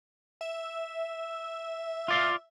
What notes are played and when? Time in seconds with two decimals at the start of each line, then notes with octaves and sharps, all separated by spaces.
0.41 E5
2.08 F4 D5 F5